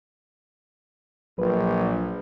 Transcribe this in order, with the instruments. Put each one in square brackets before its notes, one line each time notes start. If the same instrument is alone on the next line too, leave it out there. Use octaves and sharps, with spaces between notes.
[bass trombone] A#1 [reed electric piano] F#3 B4